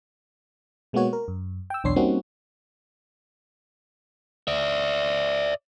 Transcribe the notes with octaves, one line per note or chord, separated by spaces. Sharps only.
B2 G#3 A#3 B3 F#4 C#5
A#4
F#2
G5 E6
B1 E2 D4 C#5 C6 C7
G3 A#3 C4 C#4 D#4 F#4
D5 E5